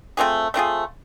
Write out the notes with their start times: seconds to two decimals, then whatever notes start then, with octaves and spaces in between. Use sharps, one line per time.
0.17 A3 C4 F4 G#4
0.54 A3 C4 F4 G#4